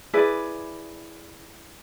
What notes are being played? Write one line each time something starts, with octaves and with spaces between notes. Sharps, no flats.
E4 G#4 B4 D5